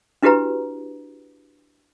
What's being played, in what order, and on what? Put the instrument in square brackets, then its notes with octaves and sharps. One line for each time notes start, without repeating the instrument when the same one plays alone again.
[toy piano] D4 E4 F#4 G4 B4 A#5